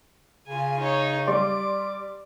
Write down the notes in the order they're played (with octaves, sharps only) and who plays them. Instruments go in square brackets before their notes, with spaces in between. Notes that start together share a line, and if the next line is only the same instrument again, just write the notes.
[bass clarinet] C#3 [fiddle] F4 G#5
[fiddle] D#4 C#5
[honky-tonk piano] G3 D5 C6 [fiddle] D6